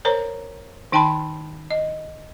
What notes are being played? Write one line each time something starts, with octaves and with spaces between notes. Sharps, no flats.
A#4 C5 C#5 A#5
D#3 D#4 G5 A5 B5 C6
D#5